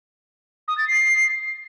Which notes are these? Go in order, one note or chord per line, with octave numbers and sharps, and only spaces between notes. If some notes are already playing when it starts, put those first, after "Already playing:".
D#6
A6
C7